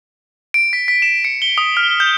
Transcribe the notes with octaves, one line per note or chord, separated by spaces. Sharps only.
D7
B6
B6
E7
C#7
G7
D#6
F6
G6